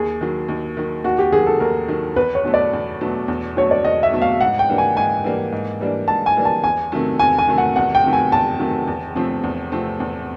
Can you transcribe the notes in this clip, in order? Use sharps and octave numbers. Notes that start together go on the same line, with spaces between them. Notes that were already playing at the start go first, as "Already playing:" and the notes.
Already playing: D#2 G#4
D#3 F#3
D#2
D#3 F#3
D#2 F#4
G4
D#3 F#3 G#4
A4
D#2 A#4
D#3 F#3
E2 B4
C#5
B2 F#3 A3
D5
E2
B2 F#3 A3
E2
B2 F#3 A3 C#5
D5
E2 D#5
E5
B2 F#3 A3
F5
G#2 F#5
G5
E3 G3 A#3 D4
G#5
G#2 G#5
E3 G3 A#3 D4
G#2
E3 G3 A#3 D4
G#2 A5
G#5
E3 G3 A#3 D4
A5
E2 G#5
C3 D#3 F#3 A3
E2 G#5
G#5
C3 D#3 F#3 A3
F#5
E2 F#5
G5
C3 D#3 F#3 A3
G#5
E2 A5
C3 D#3 F#3 A3
E2
C3 F3 A3 C4
E2
C3 F3 A3 C4
E2